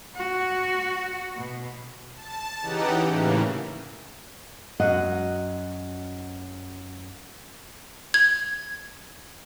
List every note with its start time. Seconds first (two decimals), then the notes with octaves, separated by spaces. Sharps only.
0.16 F#4
1.36 B2
2.15 A5
2.61 C#3 E3 D#4 G4 F#5
3.07 A2 C#3 E3 A#3
4.80 F#2 F#4 D#5 F#5
8.14 G#6